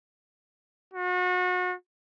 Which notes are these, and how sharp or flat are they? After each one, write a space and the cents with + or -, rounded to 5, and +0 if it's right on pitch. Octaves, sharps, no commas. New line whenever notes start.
F#4 -35